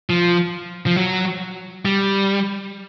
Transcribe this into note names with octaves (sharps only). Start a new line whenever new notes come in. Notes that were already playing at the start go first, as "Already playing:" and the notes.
F3
F3
F#3
G3